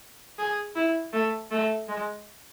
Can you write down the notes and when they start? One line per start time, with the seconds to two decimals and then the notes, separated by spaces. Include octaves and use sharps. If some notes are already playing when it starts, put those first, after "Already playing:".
0.38 G#4
0.76 E4
1.13 A3
1.51 A3
1.88 G#3